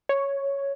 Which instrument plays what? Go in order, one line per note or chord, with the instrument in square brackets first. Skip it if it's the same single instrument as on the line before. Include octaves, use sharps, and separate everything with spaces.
[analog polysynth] C#5